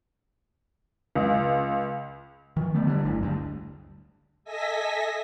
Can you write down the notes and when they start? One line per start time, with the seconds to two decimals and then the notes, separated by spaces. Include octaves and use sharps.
1.15 C#2
2.57 D#3 F3
2.74 D3 A3 B3
2.87 D3 G3
3.05 G1 F#2 A2 D3
3.23 D2 G2
4.44 A4 D#5 E5 G#5 A#6 B6